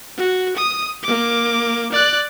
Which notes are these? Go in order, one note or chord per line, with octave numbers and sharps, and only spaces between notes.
F#4
D#6
A#3 D6
D5 F#6